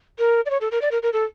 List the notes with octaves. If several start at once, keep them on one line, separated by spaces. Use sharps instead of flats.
A#4
D5
C#5
A4
A#4
D5
A#4
A#4
A4